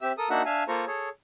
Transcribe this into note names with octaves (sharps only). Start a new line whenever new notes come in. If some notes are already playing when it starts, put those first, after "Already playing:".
C4 G4 E5 E6
A4 A#4 D#6
A#3 D4 D#4 F#4 E5 F#5
D4 E5 F5 G#5
A#3 F4 A4 C5 A#5 C#6
G#4 A4 C#5